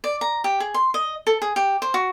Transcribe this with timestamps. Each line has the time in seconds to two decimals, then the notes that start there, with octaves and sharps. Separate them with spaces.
0.04 D5
0.21 A#5
0.44 G4
0.60 G#4
0.74 C6
0.94 D#5
1.27 A4
1.42 G#4
1.56 G4
1.82 C5
1.94 F#4